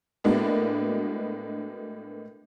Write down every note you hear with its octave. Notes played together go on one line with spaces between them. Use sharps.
A2 G#3 A#3 B3 D4 F#4